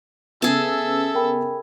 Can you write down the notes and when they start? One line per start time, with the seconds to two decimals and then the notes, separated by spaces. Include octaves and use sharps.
0.42 C#3 B3 G#4 A4 E5 A5
1.15 A#4 G5 B5